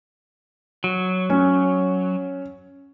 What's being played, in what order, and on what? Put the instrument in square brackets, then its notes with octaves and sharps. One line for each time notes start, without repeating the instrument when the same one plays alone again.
[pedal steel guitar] F#3
[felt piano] C#4